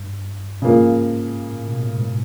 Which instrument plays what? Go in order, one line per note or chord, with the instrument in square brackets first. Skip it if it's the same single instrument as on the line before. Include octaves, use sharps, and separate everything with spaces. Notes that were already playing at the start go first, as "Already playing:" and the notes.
Already playing: [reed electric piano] G2
[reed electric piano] G#2 [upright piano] C#3 F3 A#3
[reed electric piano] A2
B2
A2
G#2